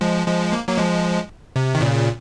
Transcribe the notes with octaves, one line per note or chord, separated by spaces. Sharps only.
F3 G#3
F3 G#3
A#3
F#3 A#3
F3 G#3
C3
D#3
A#2 C#3